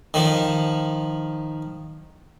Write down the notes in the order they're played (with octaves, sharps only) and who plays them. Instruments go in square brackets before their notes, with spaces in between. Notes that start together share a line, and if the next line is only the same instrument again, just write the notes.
[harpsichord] D#3 F3